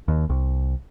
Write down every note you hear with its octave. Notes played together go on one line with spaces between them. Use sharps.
D#2
C2